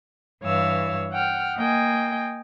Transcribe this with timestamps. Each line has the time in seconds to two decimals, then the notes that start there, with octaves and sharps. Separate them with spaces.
0.42 G2 E3 C#5 F5 E6
1.11 F#5 G5 F6
1.56 A#3 D#5 G5 G#5